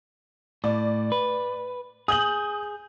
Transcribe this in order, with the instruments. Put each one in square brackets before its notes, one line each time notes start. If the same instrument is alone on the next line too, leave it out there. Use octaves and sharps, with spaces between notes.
[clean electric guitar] A2 [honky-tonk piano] D5
[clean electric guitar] B4
[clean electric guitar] G#4 [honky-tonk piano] D#6 G6 F#7